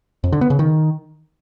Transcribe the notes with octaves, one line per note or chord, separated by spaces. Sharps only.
F2
D3
B3
C#3
D#3